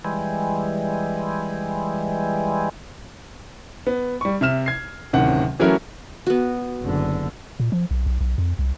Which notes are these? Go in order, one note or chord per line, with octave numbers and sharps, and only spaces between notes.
E3 G3 G#3
B3
G3 C#6
C3 E5 F6 E7
G#6 C7
D1 C3 D#3 C#4 F#5
E3 F#3 A3 C#4 E4 A#4
B3 F#4
F#1 D3
A#2
F3
B1
B1
B1
F2
C2